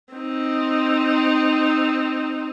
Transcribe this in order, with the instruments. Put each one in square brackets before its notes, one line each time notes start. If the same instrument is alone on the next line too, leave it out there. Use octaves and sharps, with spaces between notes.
[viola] C4 D#4